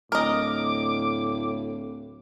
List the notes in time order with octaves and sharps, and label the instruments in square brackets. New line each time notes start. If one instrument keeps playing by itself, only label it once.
[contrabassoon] D1 [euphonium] A2 [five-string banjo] A#4 D#5 [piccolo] D6